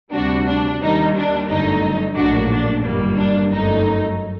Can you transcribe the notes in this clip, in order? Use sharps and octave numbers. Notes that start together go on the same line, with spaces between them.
D2 C3 G3 D4 F#4
D4
D#2 D#3 G3 A#3 D#4
D4
G1 F#2 D3 A3 D#4
A#1 A2 F#3 A#3 D4 F#4
D4
G1 F#2 D#3 G3 A#3
D4
G1 F#2 F#3 A3 D#4